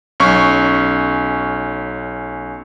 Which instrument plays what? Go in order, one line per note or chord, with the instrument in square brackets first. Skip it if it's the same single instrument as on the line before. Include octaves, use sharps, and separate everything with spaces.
[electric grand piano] B1 C#4 C#6